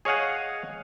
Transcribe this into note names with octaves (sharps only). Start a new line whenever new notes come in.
G#4 C#5 D#5 F5 F#5 G#5